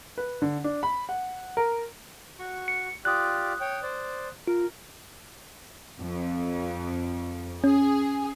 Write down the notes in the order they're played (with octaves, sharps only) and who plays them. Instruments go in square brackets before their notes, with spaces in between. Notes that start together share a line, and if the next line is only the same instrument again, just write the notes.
[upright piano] B4
D3
D4
B5
F#5
A#4
[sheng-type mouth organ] F#4 C#6
[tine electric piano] C#7
[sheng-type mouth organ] F4 G4 D5 [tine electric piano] D#6 F#6
[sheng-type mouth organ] C#5 G5
C5 D5
[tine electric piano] F4 [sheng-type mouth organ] A#4
[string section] F2
[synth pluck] C#4 [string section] G#4